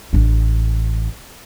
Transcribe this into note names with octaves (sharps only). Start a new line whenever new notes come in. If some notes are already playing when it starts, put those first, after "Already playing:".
A1 D4